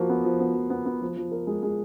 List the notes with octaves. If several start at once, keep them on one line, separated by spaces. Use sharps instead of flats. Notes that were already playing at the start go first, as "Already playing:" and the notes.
Already playing: F3 A#3 F#4
B3
F3
B3
F3
B3
B3
F3
F3
A#4
G#3
G#3